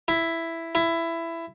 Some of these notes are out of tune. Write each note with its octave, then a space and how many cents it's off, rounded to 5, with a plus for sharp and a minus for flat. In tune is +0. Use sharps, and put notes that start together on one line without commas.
E4 +5
E4 +15